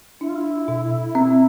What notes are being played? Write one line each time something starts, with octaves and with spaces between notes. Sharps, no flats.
D4 E4
F4
E4
B2
C4